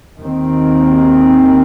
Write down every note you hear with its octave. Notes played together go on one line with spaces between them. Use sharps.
D#2 D#3 C4